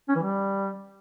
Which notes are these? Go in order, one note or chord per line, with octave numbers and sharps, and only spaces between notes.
C#4
E3
G3